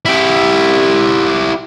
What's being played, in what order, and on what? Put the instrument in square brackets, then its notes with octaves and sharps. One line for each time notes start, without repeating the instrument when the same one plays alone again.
[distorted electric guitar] E4 G4